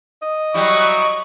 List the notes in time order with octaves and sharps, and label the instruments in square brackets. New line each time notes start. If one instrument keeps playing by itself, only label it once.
[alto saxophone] D#5
[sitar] F#3 G3 E4 [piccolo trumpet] C#6